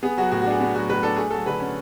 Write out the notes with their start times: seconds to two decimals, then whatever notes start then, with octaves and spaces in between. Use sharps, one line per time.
0.03 B3 G#4
0.17 F#3 F#4
0.31 A2 F#4
0.42 F#4
0.46 D4 G#4
0.60 B3 F#4
0.74 F#3 F#4
0.90 A2 B4
1.03 D4 A4
1.16 A3 G#4
1.30 F#3 A4
1.46 D3 B4
1.60 C#4